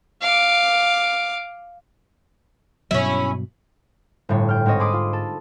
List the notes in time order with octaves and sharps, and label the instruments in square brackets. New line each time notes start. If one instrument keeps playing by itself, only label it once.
[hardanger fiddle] F5 D6
[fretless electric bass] G2 B2 F#3 [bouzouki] C#4 E4
[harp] G1 A2 C#5
G5 F6
G#2 C4 C#5 D#5
G#4 B5 C6 D6 D#6
F4
A4